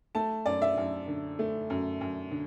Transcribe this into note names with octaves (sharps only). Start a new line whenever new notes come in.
A3 A5
F#2 D5
E5
F#2
D3
A3
F#2
F#2
D3